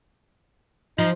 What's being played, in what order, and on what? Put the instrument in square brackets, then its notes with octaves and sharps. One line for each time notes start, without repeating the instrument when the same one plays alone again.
[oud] F3 [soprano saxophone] D#4